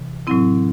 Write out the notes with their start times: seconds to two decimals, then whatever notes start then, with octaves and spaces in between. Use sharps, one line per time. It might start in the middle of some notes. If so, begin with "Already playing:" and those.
Already playing: C3 E3
0.27 A2 F#3 C4 E4